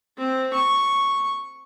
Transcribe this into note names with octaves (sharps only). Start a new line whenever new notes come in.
C4
C#6